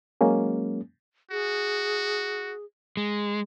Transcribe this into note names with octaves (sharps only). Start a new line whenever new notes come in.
F#3 G#3 A#3 C#4
F#4 G#4
G#3